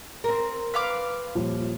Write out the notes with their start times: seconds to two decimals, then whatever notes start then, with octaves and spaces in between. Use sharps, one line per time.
0.24 C4 A#4
0.74 B4 F5 D6
1.35 D#1 F3